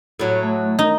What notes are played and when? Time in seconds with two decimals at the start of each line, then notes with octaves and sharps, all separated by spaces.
0.19 A2 F#3
0.43 A3
0.79 D#4